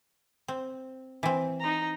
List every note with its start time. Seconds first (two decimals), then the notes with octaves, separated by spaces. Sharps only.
0.48 C4
1.23 E3 C4
1.60 D#4 A#5